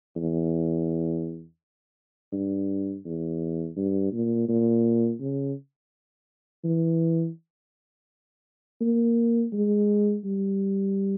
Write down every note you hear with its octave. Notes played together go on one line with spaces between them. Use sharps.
E2
G2
E2
G2
A#2
A#2
C#3
E3
A#3
G#3
G3